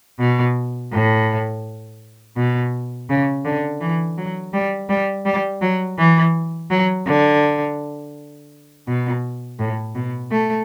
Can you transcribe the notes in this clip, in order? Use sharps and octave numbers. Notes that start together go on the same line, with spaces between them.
B2
A2
B2
C#3
D3
E3
F#3
G3
G3
G3
F#3
E3
F#3
D3
B2
A2
B2
A3